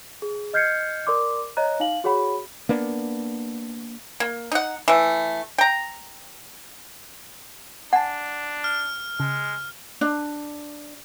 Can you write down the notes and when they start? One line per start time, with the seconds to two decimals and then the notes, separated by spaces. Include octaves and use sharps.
0.22 G#4
0.54 D#5 F6 G6 G#6 C7 C#7
1.07 A#4 D5 C6 D6
1.57 C#5 D#5 A#5 F#6
1.80 D#4 F5 F#7
2.04 F#4 G#4 C#5 F#5 B5
2.69 A#3 B3 D4
4.20 A#3
4.52 D#4 F#5
4.88 E3 A3
5.58 G5 A#5
7.93 D4 F#5 G#5 A5
8.64 F6
9.20 C#3 G#3
10.01 D4